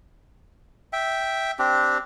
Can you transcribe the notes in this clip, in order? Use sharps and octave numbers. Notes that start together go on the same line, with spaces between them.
E5 G5
C4 D4 G4